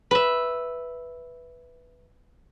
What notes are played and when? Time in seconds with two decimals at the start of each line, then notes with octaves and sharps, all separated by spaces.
0.11 B4 E5